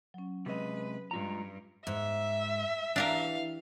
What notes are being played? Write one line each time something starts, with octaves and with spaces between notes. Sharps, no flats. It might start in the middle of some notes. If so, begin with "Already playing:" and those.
F#3 C#4
C3 G#3 B4 D#5
G2 G#3 F4 A#5
G#2 E5
E3 D4 G4 A#4 F5